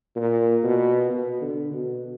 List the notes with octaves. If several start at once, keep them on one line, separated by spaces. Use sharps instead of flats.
A#2
B2
B2
D3
B2